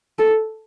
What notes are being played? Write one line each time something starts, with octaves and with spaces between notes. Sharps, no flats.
A4